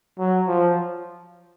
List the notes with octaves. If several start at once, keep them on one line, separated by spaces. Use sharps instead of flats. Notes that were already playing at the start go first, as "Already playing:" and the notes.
F#3
F3